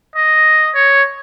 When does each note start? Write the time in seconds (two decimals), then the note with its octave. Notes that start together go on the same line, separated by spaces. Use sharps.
0.16 D#5
0.75 C#5